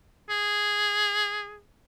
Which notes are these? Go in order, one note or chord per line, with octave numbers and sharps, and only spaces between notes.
G#4